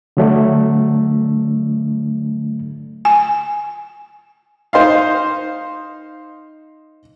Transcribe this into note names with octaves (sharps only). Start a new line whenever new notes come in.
D3 F#3 A3 D4
G#5
D#4 C5 D#5 F5